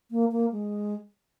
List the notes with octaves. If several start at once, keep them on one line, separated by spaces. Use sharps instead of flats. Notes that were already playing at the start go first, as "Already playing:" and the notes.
A#3
A#3
G#3